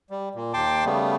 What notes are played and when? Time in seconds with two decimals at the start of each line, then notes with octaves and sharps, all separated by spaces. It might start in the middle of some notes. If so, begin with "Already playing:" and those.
0.10 G3
0.35 A#2
0.54 D#2 G5 A5 C6 D6
0.85 C#3 G3 A3 B3